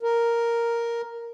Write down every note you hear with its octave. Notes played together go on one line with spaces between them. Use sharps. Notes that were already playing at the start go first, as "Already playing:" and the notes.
A#4